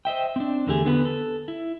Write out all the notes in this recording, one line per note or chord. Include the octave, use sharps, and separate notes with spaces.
C5 D#5 E5 G5
C4 D4
E2 D3 A3 G4 G#4
D3 B3 F#4 B4
A4
E4